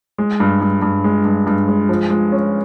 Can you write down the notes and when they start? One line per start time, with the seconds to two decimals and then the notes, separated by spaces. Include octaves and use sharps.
0.18 G#3
0.40 G2
0.61 G2
0.82 G2
1.04 G#3
1.25 G2
1.47 G2
1.68 G#3
1.89 F3
2.10 G#3
2.32 C#4